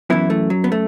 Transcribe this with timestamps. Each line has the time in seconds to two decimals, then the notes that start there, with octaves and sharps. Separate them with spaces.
0.10 F#2 E3 B3 E4
0.30 A3
0.50 F#3
0.64 B3
0.72 A3